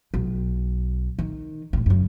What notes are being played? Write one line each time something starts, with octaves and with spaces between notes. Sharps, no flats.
B1
D#3
D2 A2
F#2 C#3